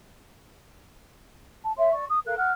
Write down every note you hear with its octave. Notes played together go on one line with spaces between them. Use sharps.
A5
C#5 E5 C6
D5 C#6
D#6
A4 A#4 F5 F#6
F#5 F6 F#6